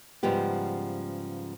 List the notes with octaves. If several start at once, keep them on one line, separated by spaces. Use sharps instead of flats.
G#2 C#3 F3 G3 B3 G4